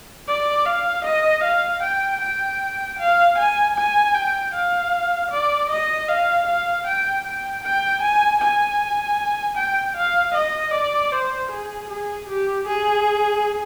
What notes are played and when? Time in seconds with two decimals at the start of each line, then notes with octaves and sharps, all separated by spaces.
0.28 D5
0.66 F5
1.05 D#5
1.44 F5
1.83 G5
2.21 G5
2.99 F5
3.38 G#5
3.76 G#5
4.14 G5
4.54 F5
5.31 D5
5.70 D#5
6.08 F5
6.48 F5
6.87 G5
7.25 G5
7.64 G5
8.02 G#5
8.41 G#5
9.57 G5
9.96 F5
10.34 D#5
10.74 D5
11.12 C5
11.51 G#4
11.89 G#4
12.29 G4
12.67 G#4